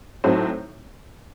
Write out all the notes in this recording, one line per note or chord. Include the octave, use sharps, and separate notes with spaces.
A2 F#3 A3 C4 D#4